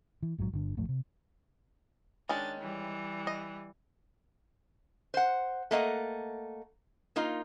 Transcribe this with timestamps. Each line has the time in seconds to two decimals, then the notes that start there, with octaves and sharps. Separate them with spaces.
0.23 E3
0.38 A#1 G#2 D#3 F#3
0.53 G1 D3
0.77 E1 A1 F3 A3
0.89 C3
2.29 D#3 G#3 C#4 D4 A6
2.59 E3 G3
3.27 D#5
5.14 C5 F#5
5.71 A3 A#3 D#5 F#5
7.16 A#3 D#4 F4